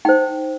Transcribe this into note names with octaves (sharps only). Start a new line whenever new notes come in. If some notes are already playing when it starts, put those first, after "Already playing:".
D#4 C5 G5